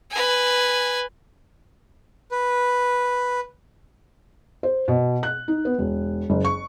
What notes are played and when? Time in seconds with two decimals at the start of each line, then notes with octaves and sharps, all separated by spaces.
0.11 B4 G#5
2.31 B4
4.63 C5
4.88 B2
5.23 F#6
5.48 D#4
5.65 B3
5.79 E1
6.30 F#1
6.45 C#6